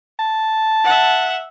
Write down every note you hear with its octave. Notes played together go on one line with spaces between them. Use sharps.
A5
E5 F#5